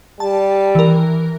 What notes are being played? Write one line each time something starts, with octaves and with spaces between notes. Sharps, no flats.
G3 A5
E3 A#4